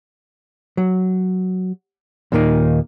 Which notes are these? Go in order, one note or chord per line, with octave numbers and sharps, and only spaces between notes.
F#3
D#2 A#2 D#3 A#3 D#4